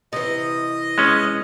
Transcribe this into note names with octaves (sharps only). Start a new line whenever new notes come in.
C3 E3 D#5
G#3 C#4